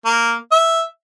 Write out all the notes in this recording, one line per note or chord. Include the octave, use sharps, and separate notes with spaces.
A#3
E5